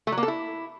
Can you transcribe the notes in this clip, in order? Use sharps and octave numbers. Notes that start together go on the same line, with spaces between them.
A3
F#3
A#3
A4
E4